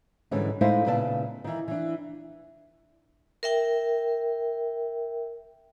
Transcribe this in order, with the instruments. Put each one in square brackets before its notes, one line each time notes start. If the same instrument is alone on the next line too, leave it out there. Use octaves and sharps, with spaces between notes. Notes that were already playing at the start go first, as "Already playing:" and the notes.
[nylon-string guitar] G#2 D3 E3 G3 G#3 C#4
A2 G#3 D#4 E4 C5 F5
A#2 C#3 B3 E4 D5 A5
D#3 E3
E3 D4
[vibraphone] A#4 E5 G5